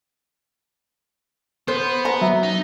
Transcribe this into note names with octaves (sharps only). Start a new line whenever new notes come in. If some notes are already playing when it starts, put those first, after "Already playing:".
B3 C5
A#5
F#3 E5
D#4